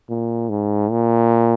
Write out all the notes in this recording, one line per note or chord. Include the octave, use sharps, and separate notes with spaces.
A#2
G#2
A#2